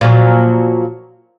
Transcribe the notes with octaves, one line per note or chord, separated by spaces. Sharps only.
A#2 F3 F#3